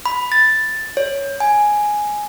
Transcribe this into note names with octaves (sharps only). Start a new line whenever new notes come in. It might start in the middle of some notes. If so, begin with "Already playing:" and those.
B5
A6
C#5
G#5